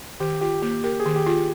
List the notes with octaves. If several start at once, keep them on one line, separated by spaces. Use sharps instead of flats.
D#3 G4
F4 G4
A#3 G4
G4 A#4
G#4
D#3
G4
F4